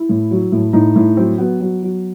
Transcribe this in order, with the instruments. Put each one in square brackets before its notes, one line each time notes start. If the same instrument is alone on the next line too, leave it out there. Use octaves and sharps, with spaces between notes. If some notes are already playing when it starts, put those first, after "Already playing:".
Already playing: [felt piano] E4
A2
F#3
A2
A2 D#4
A2
F#3 C4
F#3 B3
F#3 B3
F#3